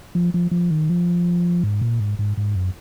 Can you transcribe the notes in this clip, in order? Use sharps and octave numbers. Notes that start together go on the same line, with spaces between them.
F3
F3
F3
D#3
F3
G#2
A#2
G#2
G#2
G#2
F#2